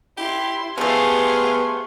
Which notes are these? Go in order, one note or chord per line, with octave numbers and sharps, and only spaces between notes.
E4 G4 C6
F3 A3 B3 G4 G#4 F5 C6